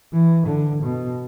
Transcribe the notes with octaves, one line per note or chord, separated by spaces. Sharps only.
E3
D3
B2